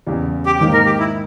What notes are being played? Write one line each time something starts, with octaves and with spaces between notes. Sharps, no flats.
E2 C#3 E3 G3
G4
G#2 D#3 A#3 D#4 G4
A#4
G4
E4